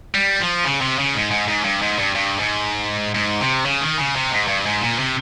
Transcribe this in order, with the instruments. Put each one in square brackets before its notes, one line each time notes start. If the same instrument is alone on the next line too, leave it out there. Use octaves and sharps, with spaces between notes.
[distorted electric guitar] G3
F3
C#3
C3
C#3
G#2
G#2
G#2
G2
G#2
G2
G2
G#2
G#2
C3
C#3
D#3
C#3
C3
G#2
G2
G#2
A#2
C3